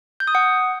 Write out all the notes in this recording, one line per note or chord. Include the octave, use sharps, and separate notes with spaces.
G6
D#6
F#5